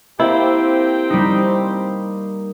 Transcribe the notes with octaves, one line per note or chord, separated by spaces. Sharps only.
A#3 C4 E4 G4
G3 D#4